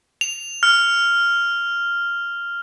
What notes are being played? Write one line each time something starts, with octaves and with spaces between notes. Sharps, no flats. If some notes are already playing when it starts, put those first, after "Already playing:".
F7
F6